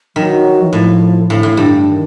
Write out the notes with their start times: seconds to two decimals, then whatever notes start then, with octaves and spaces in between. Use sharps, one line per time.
0.16 D#3 F#3
0.63 E3
0.72 A2 F3
1.29 A2 D3
1.43 A2
1.57 G2
1.87 D#3